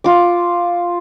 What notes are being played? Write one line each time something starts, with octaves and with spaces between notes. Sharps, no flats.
F4 D6